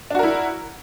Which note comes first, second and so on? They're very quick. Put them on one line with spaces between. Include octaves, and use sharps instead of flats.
D4 F#4 A#4 E4